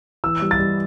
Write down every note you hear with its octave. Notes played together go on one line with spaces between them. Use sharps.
E3 E6
G3
A6
G3